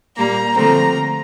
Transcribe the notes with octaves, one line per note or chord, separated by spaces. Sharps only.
A#2 G3 A#3 A#5
D3 F3 A3 C4 A#5